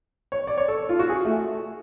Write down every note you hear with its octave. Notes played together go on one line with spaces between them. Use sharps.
C#5
D5
C#5
A4
F4
F#4
G#4
A3